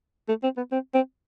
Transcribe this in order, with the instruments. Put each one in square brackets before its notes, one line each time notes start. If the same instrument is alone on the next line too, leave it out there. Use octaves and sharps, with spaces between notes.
[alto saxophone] A3
C4
B3
C4
C4